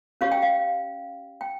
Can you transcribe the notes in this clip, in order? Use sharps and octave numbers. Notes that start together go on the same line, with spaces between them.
C#4 G4 C#5 F5
G5
F5
G5